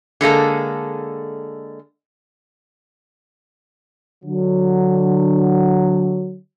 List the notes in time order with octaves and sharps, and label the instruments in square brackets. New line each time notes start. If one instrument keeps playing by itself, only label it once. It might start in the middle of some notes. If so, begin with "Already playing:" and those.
[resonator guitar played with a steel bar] D3 G#3 A#3 A4
[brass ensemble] D3 F#3